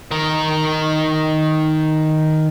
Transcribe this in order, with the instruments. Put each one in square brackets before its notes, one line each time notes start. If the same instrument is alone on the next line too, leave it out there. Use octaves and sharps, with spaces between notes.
[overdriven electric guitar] D#3 A#4